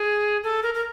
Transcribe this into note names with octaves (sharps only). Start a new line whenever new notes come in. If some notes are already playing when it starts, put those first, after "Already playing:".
Already playing: G#4
A4
A#4
A#4